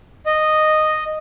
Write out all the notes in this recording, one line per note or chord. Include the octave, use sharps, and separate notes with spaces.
D#5